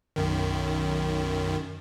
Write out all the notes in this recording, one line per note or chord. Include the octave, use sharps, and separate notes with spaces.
B1 F#2 D#3